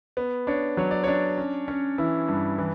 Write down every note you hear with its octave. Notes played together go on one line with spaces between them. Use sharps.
B3
D4 C#5
F#3 C#5
D5
D4 C#5
C#4
C#4
E3 E4
G2
E3